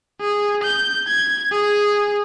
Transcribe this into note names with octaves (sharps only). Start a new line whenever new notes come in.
G#4
G6
G#6
G#4